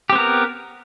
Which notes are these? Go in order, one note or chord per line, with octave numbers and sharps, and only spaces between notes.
B3 C4 G4 A#4